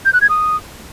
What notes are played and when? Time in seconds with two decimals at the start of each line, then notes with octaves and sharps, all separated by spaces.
0.05 G6
0.13 F#6
0.21 G#6
0.29 D#6